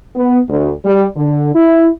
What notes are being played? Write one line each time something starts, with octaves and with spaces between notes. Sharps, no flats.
B3
D2
G3
D3
E4